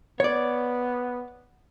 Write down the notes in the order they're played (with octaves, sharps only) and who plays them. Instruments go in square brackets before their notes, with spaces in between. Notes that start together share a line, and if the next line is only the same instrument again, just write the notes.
[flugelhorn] B3 [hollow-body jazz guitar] C#5 D5